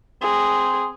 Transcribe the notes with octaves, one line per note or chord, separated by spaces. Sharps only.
C4 G#4